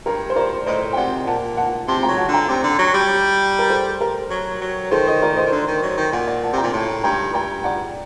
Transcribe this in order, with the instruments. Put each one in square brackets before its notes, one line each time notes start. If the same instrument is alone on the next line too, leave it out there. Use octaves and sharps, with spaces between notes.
[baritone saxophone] G2 [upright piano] G4 A#4
[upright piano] C5
A#4 D5
[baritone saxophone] A2 [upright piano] C5 D#5
[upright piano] G5
[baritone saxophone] C3 [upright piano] D5 F#5
[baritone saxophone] A#2 [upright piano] F#5 A5
[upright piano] F#5 A5
[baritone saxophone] C3 [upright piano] A5 C6
[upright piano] G5 A#5
[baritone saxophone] F#3
[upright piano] F#5 A5
[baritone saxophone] D3
[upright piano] G5 A#5
[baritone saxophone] C3
D3
F#3
G3
[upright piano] A#4
A4 C5
G4 A#4
[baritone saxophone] F#3
F#3
[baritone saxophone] D#3 [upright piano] A4 C5
[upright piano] C5 D#5
A#4 D5
C5 D#5
[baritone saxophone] D#3
D3
D#3
F#3
D#3
[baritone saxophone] A#2 [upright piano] D5 F#5
[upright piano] D5 F#5
F#5 A5
[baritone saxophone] C3 [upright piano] G5 A#5
[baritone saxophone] A#2
[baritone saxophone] A2 [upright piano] A5 C6
[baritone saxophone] G2 [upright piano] G5 A#5
[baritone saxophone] G2 [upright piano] G5 A#5
[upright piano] D5 F#5